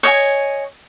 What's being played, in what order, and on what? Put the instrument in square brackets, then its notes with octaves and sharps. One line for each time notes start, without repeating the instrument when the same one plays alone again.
[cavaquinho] C#5 D#5 E5 G#5